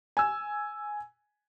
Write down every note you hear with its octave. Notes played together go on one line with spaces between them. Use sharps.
G#5 E6